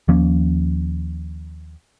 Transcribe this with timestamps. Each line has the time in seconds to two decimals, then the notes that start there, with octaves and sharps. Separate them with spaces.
0.08 D#2 F3 A#3 C#4